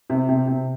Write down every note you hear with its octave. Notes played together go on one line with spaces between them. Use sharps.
C3
C3
C3